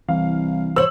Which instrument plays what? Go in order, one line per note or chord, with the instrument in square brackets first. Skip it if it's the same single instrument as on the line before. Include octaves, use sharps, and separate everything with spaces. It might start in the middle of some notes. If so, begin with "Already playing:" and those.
[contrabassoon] C2 [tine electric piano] E3 [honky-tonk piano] F5
[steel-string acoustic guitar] C5 C#5 [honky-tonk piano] E6 F#7